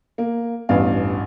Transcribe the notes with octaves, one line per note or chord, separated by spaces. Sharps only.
A#3
A1 E2 G2 F5